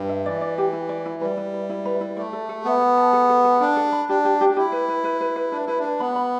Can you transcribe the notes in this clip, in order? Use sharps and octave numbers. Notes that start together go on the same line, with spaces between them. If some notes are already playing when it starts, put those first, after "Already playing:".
Already playing: G2
E5
E3 D5
D5
G4
E4
D5
E4
G3 B4
E4
B4
E4
B4
E4
A3 D5
A4
A4
B3 A4
A4
A5
A4
A4
A4
D4 G5
A4
B5
D4 G4
G4
G4
D4
E4 G4
B4
B4
B4
B4
B4
D4 B4
E4 B4
D4 B4
B3 B5
B5